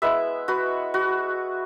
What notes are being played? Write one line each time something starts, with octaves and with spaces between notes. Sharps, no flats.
G#3 B3 E4 B4 E5
F#4 B4
F#4